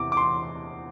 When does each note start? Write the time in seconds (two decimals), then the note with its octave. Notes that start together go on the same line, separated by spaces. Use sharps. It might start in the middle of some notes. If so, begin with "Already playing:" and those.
Already playing: E2 C3 E3 D6
0.12 D6
0.17 C6